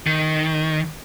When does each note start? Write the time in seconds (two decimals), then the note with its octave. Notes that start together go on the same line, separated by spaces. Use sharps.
0.07 D#3